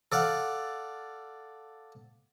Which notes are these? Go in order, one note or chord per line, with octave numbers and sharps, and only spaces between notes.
A4 D5 F5 F#5